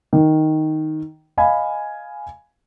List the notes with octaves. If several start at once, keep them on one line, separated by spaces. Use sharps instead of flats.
D#3
D#5 F5 G#5 B5